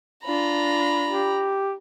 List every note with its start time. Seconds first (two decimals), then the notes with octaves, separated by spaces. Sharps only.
0.25 D4 F4 A#5 B5
1.07 G4